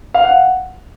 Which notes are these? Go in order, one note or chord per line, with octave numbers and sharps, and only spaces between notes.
F5
F#5